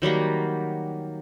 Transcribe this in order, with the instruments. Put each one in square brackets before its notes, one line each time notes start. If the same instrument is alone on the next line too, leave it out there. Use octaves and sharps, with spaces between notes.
[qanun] D#3 F#3 G3 A#3